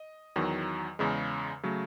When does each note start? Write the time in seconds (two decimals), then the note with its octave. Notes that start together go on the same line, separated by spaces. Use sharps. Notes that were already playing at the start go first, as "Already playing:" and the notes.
Already playing: D#5
0.36 E2 D#3 F#3
0.99 E2 C#3 G#3
1.63 C#3 F#3 A3